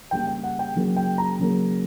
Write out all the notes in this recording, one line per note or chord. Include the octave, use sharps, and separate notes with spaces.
C#3 G3 A#3 G5
G5
F#5
G5
C#3 F#3 A#3
G5
A#5
C#3 F#3 A#3